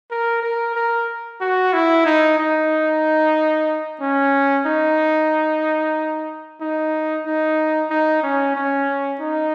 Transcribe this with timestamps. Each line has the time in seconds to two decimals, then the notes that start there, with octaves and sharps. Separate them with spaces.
0.11 A#4
0.43 A#4
0.75 A#4
1.41 F#4
1.73 E4
2.06 D#4
2.39 D#4
4.01 C#4
4.66 D#4
6.61 D#4
7.26 D#4
7.90 D#4
8.23 C#4
8.55 C#4
9.20 D#4